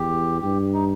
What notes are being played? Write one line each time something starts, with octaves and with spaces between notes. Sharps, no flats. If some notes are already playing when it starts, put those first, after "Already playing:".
Already playing: E2 G4
G2 G4
D#4